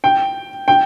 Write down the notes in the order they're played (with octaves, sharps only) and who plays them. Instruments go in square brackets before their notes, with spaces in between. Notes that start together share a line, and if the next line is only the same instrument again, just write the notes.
[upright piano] G5
G5